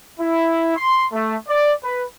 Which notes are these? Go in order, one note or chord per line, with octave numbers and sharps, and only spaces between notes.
E4
C6
A3
D5
B4